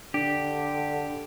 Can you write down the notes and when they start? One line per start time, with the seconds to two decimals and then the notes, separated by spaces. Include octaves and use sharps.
0.14 D3 D4 G4